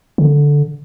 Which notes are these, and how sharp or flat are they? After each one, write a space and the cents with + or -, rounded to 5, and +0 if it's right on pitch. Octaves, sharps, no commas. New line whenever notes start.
D3 -10